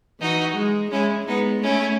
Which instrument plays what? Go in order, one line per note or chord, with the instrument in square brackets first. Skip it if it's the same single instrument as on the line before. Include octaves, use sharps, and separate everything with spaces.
[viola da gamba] E3 [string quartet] D#4 F#4
[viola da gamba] G#3
[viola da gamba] G#3 [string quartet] C#4 E4
[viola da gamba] G#3 [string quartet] B3 D#4
[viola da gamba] A3 [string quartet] C#4 E4